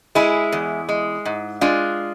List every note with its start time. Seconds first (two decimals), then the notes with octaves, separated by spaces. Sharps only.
0.15 G#3 E4 G#4
0.52 E2
0.89 G#3
1.25 G#2
1.61 G#3 D4 F4